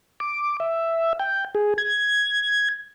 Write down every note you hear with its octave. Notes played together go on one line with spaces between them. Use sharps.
D6
E5
G5
G#4
G#6